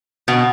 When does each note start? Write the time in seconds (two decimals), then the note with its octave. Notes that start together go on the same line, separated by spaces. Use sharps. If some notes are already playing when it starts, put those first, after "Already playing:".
0.28 B2